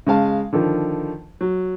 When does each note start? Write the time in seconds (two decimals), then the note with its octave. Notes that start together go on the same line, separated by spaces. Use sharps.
0.07 C#3 G#3 F5 A5
0.53 D3 D#3 F3
1.41 F#3